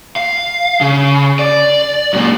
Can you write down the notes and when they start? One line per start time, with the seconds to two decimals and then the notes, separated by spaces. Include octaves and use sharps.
0.16 F5
0.81 C#3
1.39 D5
2.13 F#2 A#2